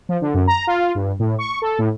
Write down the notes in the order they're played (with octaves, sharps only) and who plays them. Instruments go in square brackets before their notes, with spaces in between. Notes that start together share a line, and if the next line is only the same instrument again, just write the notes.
[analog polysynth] F3
D3
F#2
A#5
F4
G2
A2
C#6
A4
A2